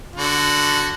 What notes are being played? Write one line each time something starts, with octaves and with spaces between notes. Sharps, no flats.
D3 F#4